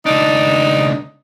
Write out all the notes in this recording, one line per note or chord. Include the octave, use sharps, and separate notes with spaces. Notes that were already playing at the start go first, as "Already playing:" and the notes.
C#2 D4 D#4